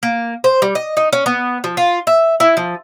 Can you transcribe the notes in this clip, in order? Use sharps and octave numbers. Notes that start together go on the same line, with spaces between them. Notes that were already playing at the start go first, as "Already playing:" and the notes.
A#3
C5
G3
D#5
D#4
C#4
B3
F3
F4
E5
E4
F3